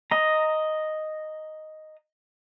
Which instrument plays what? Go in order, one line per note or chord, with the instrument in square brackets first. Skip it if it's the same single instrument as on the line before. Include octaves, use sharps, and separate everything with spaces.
[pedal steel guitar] D#5 A#5